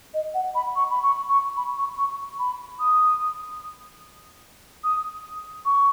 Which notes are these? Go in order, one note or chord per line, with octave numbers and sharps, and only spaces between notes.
D#5
F#5
B5
C#6
B5
C#6
C#6
B5
C#6
C#6
B5
D#6
D#6
C#6